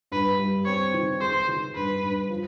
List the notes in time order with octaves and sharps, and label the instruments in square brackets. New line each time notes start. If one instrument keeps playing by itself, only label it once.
[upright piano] G2 [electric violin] B4
[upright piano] G3
[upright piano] C4 [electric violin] C#5
[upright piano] D#3
[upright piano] G#3 [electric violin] C5
[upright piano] D#3
[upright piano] G2 [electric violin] B4
[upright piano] G2
F3